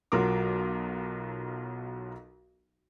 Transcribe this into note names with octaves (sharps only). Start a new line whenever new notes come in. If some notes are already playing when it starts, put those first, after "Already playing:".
B1 F#3 F4 A#4 D6